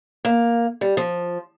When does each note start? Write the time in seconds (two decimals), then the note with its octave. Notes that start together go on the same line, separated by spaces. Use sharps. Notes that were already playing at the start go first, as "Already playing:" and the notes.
0.25 A#3
0.81 G3
0.97 F3